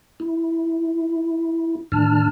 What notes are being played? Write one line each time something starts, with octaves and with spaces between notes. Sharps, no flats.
E4
A2 D#3 D4 A5 F6